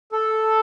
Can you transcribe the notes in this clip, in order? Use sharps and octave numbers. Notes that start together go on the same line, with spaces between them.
A4